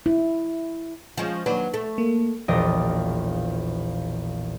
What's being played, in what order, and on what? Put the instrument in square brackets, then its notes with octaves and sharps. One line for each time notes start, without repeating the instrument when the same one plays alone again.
[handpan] E4
[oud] F3 G#3 C#4
[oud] D#2 F#3 D4 [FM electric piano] B4
[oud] A3
[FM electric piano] A#3
[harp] E1 A#1 D5 D#5 G5